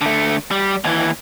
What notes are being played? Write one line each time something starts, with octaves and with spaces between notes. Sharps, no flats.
D3 A3
G3
D#2 E3